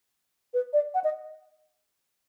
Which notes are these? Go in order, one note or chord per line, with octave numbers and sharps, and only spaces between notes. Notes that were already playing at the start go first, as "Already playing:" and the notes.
B4
D5
F#5
D#5